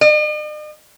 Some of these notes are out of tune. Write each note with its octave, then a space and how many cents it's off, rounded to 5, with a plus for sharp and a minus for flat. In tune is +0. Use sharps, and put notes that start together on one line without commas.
D#5 -45